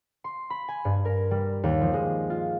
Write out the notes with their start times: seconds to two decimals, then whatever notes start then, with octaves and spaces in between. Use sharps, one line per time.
0.24 C6
0.50 B5
0.68 G#5
0.85 G2
1.05 A#4
1.31 G3
1.63 D#2
1.81 F3
1.93 G#3
2.30 F4